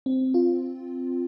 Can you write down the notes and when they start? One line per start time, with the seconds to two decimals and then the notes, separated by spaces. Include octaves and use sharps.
0.06 C4
0.34 F4